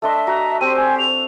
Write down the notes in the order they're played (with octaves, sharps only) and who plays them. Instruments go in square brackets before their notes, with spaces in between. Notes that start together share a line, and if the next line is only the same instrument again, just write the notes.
[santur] A3 D4 C6 [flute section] D#5 E5
[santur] F#4 [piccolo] A#5
[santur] C4 [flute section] G4 C5 [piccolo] D#7
[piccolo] G#5
F7